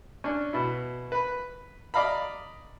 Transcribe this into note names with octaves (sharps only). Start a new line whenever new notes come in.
C#4 D4
B2 E4
B4 B5
D5 D#5 F5 A#5 B5